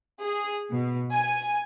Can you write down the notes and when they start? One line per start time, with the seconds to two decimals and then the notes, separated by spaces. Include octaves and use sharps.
0.22 G#4
0.70 B2
1.14 G#5